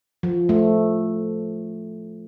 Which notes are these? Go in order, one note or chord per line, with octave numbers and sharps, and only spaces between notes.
F3
A3